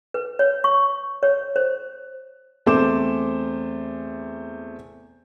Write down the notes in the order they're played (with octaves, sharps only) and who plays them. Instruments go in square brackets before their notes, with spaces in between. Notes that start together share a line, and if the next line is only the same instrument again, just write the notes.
[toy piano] B4
C#5
C#6
C#5
C5
[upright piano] E2 A3 C4 C5 D6 E7